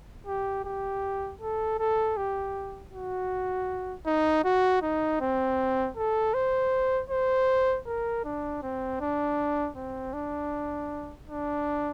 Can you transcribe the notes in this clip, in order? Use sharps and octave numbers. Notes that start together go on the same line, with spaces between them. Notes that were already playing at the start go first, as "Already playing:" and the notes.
G4
G4
A4
A4
G4
F#4
D#4
F#4
D#4
C4
A4
C5
C5
A#4
D4
C4
D4
C4
D4
D4